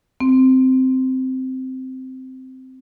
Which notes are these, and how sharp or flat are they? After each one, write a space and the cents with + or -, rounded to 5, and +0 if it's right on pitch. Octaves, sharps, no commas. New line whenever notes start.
C4 -10